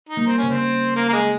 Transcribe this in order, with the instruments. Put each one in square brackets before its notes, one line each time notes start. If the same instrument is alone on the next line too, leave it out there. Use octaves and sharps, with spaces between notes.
[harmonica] D#4
[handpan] G3 A#3
[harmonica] C4
C#4
[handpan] C#3
[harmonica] C4
A#3
A#3
G#3